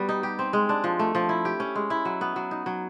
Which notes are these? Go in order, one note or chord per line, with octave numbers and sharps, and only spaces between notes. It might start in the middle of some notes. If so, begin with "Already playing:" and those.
Already playing: G3 B3 F#4
D#4
G4
C4
G#3
D4
F3
A3
F3
E4
G4
C#4
G#3
E4
F#3
B3
F#3
D#4
F#3